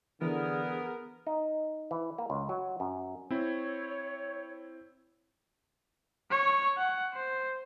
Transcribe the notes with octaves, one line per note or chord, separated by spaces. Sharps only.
D3 E3 B3 G#4 A#4
D#4
E3
A#3
C#2
F#3
F#2
C4 E4 C#5
C#5 C#6
F#5
C5